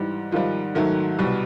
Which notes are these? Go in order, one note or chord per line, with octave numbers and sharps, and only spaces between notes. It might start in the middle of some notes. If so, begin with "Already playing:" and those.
Already playing: G#2 E3 G3
G#2 D#3 F3 G3 F4
G#2 D#3 F#3 A3
C2 B2 G3